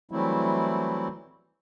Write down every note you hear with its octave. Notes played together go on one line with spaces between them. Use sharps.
E3 F#3 G3 A3 C4 E4